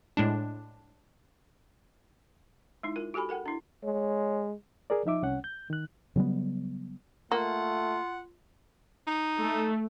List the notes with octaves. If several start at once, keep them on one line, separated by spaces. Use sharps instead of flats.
A2 G#3 D4
G#3 D#4 E4
F4 A#4
F#4 G4 A4 G#5 B5
A4 A#4 F#5 G5
D4 E4
G#3 C#5
G#4 A#4 D5
F3 D#4 E5 D6
C2 C#4 F#5
G6
D#3 F#6
C#3 F#3 G3 B3
A3 A#3 F4 F#5
D#4
A3